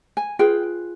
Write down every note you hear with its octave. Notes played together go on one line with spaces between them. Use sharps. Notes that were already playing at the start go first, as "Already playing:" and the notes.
G#5
F4 G#4 B4 G5